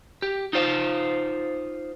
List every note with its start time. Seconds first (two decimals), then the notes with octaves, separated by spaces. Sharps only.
0.22 G4
0.53 D#4 F4 C5 F5